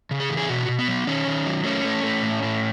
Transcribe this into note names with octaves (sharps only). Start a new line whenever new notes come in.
C#3
G#4
E3
G#4
B2 F#4
B2
B3
F#3
D#3 C#4
D#3
F#3
A3 C#4
A3
A3
A2
A2